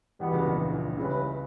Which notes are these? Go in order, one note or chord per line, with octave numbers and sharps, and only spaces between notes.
E2 B2 E3 G3 B3
C#2 C#3
A#1 A#2
A#1 A#2
C#2 C#3 E3 G3 C#4 E4 B4